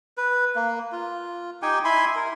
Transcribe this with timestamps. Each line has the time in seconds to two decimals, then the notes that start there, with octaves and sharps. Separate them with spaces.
0.18 B4
0.55 A#3
0.92 F4
1.62 D#4 G4 G5 G#5
1.84 E4 G#5 B5 C6
2.16 A#4